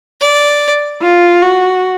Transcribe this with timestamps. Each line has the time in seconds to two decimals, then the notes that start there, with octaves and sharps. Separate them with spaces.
0.21 D5
1.02 F4
1.42 F#4